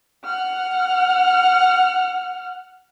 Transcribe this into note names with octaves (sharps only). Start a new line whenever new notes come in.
F#5 F6